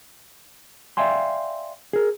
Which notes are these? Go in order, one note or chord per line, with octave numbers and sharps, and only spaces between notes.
D5 E5 F5 G5 G#5 C6
G#4 A#4